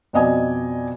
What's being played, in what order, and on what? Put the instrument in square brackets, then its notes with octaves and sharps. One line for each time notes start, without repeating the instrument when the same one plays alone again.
[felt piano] F2 B2 D5 D#5 G#5